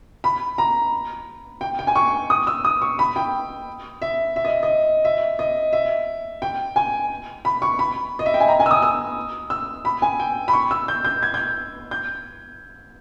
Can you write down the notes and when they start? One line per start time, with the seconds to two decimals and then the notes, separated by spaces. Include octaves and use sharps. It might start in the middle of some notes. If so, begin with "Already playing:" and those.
0.24 B5
0.58 A#5
1.61 G5
1.79 G5
1.87 G#5
1.95 C#6
2.30 D#6
2.47 E6
2.65 D#6
2.82 C#6
2.99 B5
3.16 G5
4.02 E5
4.36 E5
4.45 D#5
4.63 D#5
5.05 E5
5.39 D#5
5.73 E5
6.42 G5
6.76 G#5
7.45 B5
7.62 C#6
7.79 B5
8.19 D#5
8.26 E5
8.34 G5
8.40 G#5
8.48 A#5
8.60 G#5
8.66 E6
8.71 D#6
8.82 E6
9.50 E6
9.85 B5
10.02 G#5
10.20 G5
10.48 B5
10.53 C#6
10.71 E6
10.88 G6
11.05 G6
11.23 G#6
11.34 G6
11.91 G6